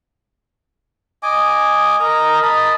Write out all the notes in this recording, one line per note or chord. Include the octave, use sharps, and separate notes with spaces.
D#5 G#5 D6
A#4 D#5 A#5
D#5 A5 B5